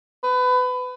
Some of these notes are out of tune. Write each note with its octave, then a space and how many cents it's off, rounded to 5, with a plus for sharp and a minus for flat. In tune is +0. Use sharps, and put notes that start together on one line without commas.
B4 +25